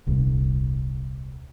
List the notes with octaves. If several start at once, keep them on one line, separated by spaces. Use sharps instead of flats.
D#1 C2